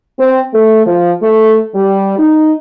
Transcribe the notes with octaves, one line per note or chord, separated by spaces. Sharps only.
C4
A3
F3
A3
G3
D#4